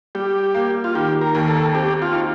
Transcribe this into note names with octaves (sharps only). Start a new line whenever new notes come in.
G3 G4
A#3
F4
D#3 G4
A#4
D#2
A4
C4 G4
F4
D#4